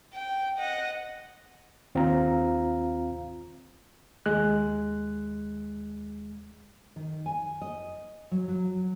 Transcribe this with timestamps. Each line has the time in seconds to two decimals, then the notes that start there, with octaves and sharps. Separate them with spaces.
0.14 G5
0.59 D#5 F#5
1.95 D#2 C4 F4 F5 A#5
4.26 D#2 G#3 F#6
6.96 D#3
7.26 G#5
7.62 D#5
8.31 F#3
8.48 F#3